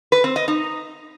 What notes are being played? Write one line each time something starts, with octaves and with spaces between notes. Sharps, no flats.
B4
C4
D#5
D#4